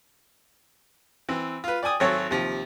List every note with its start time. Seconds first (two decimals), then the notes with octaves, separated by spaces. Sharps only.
1.29 E3 C4
1.64 F4 B4
1.83 D5 G5 G#5 D#6
2.00 G#1 F#3 C4 A4 C#5 G#5
2.30 D#2 C3 F3